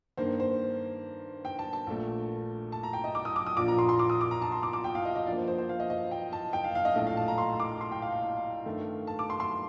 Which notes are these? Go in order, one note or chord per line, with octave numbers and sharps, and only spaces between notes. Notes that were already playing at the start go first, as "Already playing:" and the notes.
G2 D#3 A#3 C5
C5
G5
A5
A5
A#1 A#2 A3
A5
A#5
G5
D#5
D6
D#6
D6
D#6
A#1 A#2 F3 D6
A#5
C6
C6
D6
D#6
D6
A#5
A5
C6
D6
D6
G5
F5
D#5
D#5
G2 F3 A#3 D5
C5
C5
C5
F5
D#5
D#5
G5
A5
G5
F5
F5
D#5
A#1 A2 A3 D#5
F5
A5
A#5
C6
D6
C6
G5
F5
F5
G2 D#3 A3
A5
D6
C6
C6